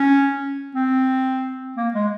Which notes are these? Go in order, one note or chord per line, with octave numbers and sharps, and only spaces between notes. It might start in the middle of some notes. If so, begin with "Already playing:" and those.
Already playing: C#4
C4
A#3
G#3